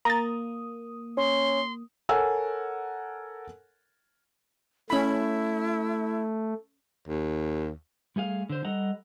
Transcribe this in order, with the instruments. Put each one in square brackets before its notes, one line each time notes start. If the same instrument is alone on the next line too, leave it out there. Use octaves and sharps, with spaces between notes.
[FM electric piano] A#3 D#6 [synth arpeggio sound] A#5 A6
[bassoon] C#4 [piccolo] C6
[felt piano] A4 A#4 C#5 F#5 G#5 E6
[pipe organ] A3 [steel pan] C#4 B5 [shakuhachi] E4
[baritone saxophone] D#2
[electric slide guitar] G3 A3 G#4 F5
D3 C5
G3 A4 D#5 F#5 A#5